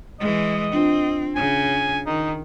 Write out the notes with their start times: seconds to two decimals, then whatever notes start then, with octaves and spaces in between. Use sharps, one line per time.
0.20 E3 G#3 D#5
0.73 C4 D4 F4
1.36 C#3 G#5
2.06 D#3 D#4